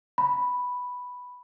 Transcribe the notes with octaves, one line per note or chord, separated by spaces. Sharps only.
B5